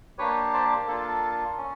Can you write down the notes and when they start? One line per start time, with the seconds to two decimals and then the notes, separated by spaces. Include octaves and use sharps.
0.18 A#3 D4 G4 B4 C#5
0.54 C5 D5
0.88 A#3 D4 F4 A4
1.58 C#4